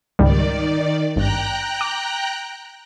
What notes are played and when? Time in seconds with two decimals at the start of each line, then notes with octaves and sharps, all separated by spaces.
0.19 C#2 G#2 D#3 G3 D5
1.16 G#1 G2 G5 A#5 F#6
1.81 D6